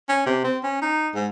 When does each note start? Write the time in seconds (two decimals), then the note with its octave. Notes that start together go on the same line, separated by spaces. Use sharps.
0.09 C#4
0.26 C3
0.44 C4
0.63 C#4
0.82 D#4
1.15 G#2